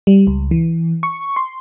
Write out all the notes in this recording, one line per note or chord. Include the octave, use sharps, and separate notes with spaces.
G3
C#2
E3
C#6
C6